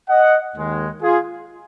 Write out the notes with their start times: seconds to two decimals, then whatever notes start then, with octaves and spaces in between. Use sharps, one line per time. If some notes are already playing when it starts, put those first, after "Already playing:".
0.08 D#5 F#5
0.55 D#2 D#3 G#3
1.03 F4 G#4